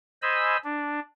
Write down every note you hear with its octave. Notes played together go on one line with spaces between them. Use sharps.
C5 D#5 G#5 B5 E6
D4